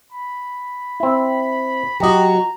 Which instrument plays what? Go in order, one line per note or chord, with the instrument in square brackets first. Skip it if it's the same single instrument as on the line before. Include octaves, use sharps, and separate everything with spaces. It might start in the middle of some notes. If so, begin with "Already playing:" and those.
[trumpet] B5
[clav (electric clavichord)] C4 E4
[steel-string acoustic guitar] F#3 F#4 [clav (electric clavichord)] G4 D#5 [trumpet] A#5